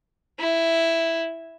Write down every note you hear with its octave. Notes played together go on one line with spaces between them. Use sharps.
E4